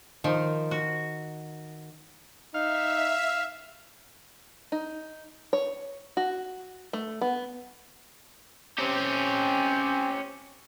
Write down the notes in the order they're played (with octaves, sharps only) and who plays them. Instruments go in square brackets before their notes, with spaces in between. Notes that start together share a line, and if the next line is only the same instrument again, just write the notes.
[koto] D#3 F3
F#4
[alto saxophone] D#4 [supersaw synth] E5 [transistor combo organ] F5
[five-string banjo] D#4
C#5
F#4
A3
B3
[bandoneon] C4 [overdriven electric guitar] C#4 G4